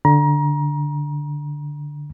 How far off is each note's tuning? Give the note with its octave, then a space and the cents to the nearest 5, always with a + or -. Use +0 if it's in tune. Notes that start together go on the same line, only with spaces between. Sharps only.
D3 +0 A#5 +30